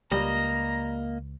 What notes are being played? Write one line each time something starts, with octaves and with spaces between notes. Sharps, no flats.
C#2 G3 A#3 D#5 A#5